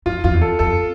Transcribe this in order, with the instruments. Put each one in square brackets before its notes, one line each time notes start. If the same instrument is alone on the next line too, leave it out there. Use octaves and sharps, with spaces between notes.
[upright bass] F2 [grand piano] F4
[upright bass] F2 [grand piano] F4
[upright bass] E2
[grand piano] A4
[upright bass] F2 [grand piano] A4